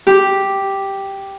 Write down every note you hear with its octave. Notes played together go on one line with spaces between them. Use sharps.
G4